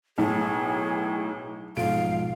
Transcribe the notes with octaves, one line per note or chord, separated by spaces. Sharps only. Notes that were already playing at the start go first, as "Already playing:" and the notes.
B1 A2 G#4 A5
B1 G#2 F3 F5 D7